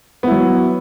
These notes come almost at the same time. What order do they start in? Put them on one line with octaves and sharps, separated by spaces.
B3 E4 F#3